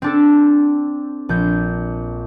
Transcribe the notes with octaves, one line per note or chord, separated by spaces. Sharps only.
C4 D4 A4
A#1 G6